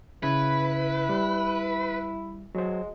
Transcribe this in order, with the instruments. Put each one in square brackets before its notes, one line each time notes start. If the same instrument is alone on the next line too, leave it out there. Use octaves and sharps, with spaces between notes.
[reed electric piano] C#3 G#6 [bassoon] E4 [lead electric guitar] B4
[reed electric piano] G3
[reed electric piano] F#3 C5 [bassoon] G#3